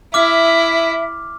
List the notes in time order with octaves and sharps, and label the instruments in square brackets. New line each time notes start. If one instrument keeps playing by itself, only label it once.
[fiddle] E4 [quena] E5 [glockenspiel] D6 F6